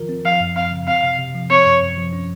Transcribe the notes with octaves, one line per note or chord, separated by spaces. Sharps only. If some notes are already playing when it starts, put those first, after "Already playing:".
Already playing: D#3 F3 F4 A#4
C4
F3 F5
F#2
C4 F5
C#3
C4 F5
C3
C3
F3
C4 C#5
F#2
F#2
F3
C#4